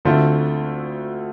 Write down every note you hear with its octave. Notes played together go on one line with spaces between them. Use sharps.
D2 D3 A3 C4 F4